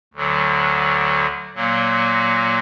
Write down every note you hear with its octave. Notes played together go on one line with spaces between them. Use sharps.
D2 D3 F#3
A#2 F#3 A#3